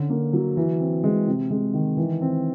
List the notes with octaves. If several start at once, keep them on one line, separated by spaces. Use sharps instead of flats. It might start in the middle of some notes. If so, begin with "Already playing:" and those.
Already playing: D3 C#4
A#3
F#3
E3
C4
G#3
C3
G#3
D#3
E3
C4